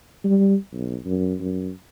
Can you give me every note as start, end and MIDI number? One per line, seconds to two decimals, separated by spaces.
0.24 0.55 55
0.73 0.96 35
1.05 1.34 42
1.41 1.71 42